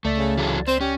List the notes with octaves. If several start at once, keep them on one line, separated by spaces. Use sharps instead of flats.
C#2 A3 D5 A6
C#3
E3 F#3 A4
C4 C5
C#4 G4